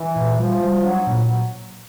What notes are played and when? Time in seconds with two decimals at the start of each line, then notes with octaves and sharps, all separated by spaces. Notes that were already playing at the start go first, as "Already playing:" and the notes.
Already playing: E3
0.16 A#2
0.38 F3 G3
0.61 G3
0.84 F#3 D4
1.07 A#2